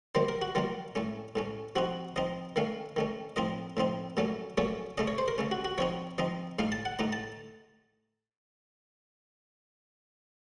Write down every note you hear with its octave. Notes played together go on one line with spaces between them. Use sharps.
D#3 F#3 A#3 C5
A#4
F#4
D#3 F#3 A#3 F4
A2 A3 C#4
A2 A3 C#4
F3 C4 D#4 F#4
F3 C4 D#4 D#5
D#3 A3 C#4 F5
D#3 A3 C#4
A2 F3 C4 D#4 D#5
A2 F3 C4 D#4
A#2 F#3 A3 C#4
A#2 F#3 A3 C#4 C#5
C#3 A3 C#4 D#5
C#5
C5
A#4
C#3 A3 C#4
F#4
F#4
F3 C4 D#4 C#5
F3 C4 D#4 D#5
A2 A3 D#4 F5
A5
F#5
A2 A3 D#4 A#5
A5